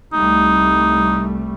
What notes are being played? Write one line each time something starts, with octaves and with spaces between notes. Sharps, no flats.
C2 G3 A3 D#4